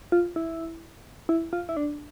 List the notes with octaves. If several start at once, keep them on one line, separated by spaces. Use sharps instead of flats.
F4
E4
E4
F4
E4
D4